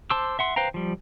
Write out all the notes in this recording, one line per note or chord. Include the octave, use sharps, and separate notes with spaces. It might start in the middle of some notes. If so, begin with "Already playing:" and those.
C5 A5 C6 D6 E6
E5 F#5 C6
B4 C5 F5 G5 A#5
F3 G3